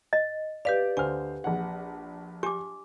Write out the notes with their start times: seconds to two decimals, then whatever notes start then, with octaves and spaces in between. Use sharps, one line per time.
0.13 D#5
0.65 G4 B4 D5 F5
0.97 D2 C5 G#5 F6
1.44 A#1 F#5
2.43 G4 G#5 D6